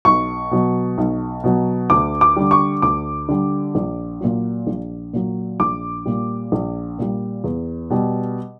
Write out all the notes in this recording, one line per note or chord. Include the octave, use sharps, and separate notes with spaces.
B1 C#6
B2 F#3
B1
B2 F#3
D2 D6
D6
D3 G3
C#6
D2 D6
D3 G3
A#1
A#2 F#3
A#1
A#2 F#3
A#1 D6
A#2 G3
A#1
A#2 G3
E2
B2 G3